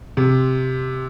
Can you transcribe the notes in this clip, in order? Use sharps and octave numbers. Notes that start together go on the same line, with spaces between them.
C3